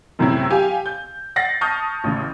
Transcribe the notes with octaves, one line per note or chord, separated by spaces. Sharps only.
F#2 A2 C3 F#3 C#4 E4
G4 F5 G#5
G6
F#5 A6 A#6 C7
A5 C#6 D#6 F6 G6
A1 C#3